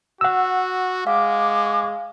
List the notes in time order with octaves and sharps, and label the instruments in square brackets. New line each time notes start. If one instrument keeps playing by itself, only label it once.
[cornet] F#4 [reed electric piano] F#5 E6
[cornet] G#3 [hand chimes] F5 [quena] D6